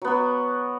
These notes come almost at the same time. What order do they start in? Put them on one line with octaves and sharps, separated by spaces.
F#3 B3 F#4